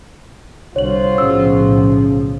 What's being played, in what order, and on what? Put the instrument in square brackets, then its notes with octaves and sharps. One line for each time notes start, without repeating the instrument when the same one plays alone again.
[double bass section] C2 [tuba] D3 [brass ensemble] F4 F#4 C5 [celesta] C#5 F#7
[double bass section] B1 A2 F3 [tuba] C#3 [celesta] E6